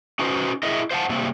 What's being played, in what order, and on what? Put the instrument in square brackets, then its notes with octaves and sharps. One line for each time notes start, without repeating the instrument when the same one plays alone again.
[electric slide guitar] C#4 D#4 F#4 B4 C5
E4 G#4 A#4 D#5 E5
C5 F5 F#5 A5
C3 G3 A#3 C4